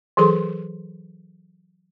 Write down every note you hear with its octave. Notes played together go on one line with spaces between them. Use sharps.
E3 F#3 G#4 A4 C6